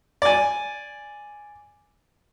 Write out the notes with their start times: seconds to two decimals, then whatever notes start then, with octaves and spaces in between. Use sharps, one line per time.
0.22 D5 G#5